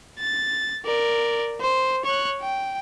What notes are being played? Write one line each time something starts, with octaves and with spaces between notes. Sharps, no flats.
A6
A#4 D5
C5
C#5 F#6
G5